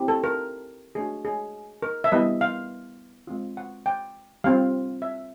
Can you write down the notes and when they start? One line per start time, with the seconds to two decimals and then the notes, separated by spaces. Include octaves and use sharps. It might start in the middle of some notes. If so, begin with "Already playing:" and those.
Already playing: C4 E4 G4
0.08 A4
0.24 A#4
0.95 A3 D4 F#4 G#4
1.25 G#4
1.82 A#4
2.04 E5
2.12 G3 B3 E4 D#5
2.41 F5
3.27 G#3 C4 F4
3.57 F#5
3.86 G5
4.44 G3 C4 F4 F5
5.02 E5